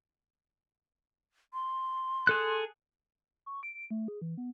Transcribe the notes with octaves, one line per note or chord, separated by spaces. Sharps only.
C6
G#4 A4 F#6
C#6
D7
D7
A3
G#4
E3
B3